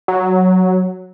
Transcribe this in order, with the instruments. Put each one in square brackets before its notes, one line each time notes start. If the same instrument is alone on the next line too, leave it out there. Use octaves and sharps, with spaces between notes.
[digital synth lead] F#3